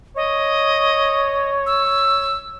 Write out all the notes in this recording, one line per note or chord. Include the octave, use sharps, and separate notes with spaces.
C#5 D#5
E6